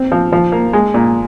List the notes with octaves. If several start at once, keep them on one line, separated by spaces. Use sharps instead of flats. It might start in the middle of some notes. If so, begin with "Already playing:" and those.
Already playing: C4
F3
F3
A#3
G#3
A#2